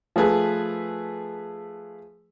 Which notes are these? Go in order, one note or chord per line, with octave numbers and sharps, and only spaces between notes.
F3 A3 G#4 B4